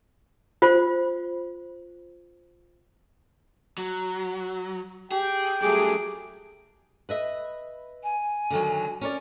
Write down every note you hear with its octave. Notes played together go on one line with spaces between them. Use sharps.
F4 C5
F#3
G4 G#4 G5
G2 F#3 A3 G4 G#4 D6
B4 D#5 E5
G#5
D3 D#3 F#3
C#4 A#4 D5